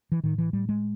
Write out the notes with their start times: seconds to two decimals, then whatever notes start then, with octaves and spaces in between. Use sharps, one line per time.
0.12 E3
0.24 A2 D#3
0.38 E3
0.53 A2 G3
0.69 G#3